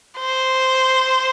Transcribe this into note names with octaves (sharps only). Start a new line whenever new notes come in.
C5